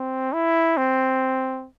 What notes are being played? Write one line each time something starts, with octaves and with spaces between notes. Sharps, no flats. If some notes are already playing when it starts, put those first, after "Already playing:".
Already playing: C4
E4
C4